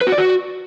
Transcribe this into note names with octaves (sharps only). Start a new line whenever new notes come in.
B4
F#4
D5
F#4